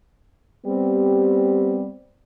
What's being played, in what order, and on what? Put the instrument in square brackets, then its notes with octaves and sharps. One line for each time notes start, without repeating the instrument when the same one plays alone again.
[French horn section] G3 B3 C4 G4